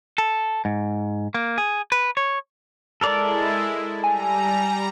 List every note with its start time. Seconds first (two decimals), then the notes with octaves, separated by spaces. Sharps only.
0.18 A4
0.65 G#2
1.34 A#3
1.58 G#4
1.92 B4
2.17 C#5
3.01 G#3 E4 A4 A#4 D5
4.04 G3 G#5 A#5